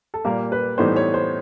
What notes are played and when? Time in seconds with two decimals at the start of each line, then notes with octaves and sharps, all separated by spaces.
0.14 A4
0.25 A#2 G3 A#3 A#4
0.52 B4
0.78 A2 E3 G3 B3 D#4 C5
0.96 C#5
1.14 C5